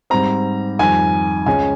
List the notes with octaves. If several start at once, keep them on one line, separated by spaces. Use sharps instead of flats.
G#2 G3 C4 A#5
F2 D#3 G3 G#5
C#2 C#3 G#3 C#4 G#5